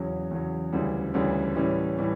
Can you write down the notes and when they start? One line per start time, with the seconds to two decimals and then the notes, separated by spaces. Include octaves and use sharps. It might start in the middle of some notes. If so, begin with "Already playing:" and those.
Already playing: E2 C#3 F#3
0.31 E2 C#3 F#3
0.73 D2 C#3 E3 G3
1.14 D2 C#3 E3 G3
1.56 A2 E3 G3 C#4
1.97 A2 E3 G3 C#4